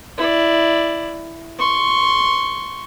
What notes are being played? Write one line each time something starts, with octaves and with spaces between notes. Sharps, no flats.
E4 D5
C6 C#6